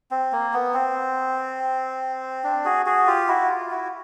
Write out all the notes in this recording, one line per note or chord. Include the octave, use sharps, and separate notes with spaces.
C4
A#3
B3
C4
D4
F#4 G#4
F#4 G#4
F4 G4
E4 F#4
F4
E4 F#4